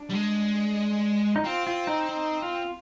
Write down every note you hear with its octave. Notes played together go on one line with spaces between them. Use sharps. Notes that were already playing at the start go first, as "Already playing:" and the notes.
Already playing: D4
G3
G#3
D#4
C4 F4
F4
D#4
D#4
F4